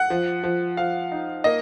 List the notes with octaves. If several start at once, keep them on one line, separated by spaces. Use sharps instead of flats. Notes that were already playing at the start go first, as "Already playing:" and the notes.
Already playing: F#5
F3
F3
F3 F5
D#4
A#3 D#5